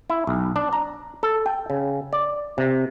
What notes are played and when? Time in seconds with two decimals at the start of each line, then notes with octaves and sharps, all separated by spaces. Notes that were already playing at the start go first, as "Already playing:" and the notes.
0.10 E4
0.27 B1
0.56 D4
0.73 A#5
1.23 A4
1.46 G5
1.70 C#3
2.13 D5
2.58 C3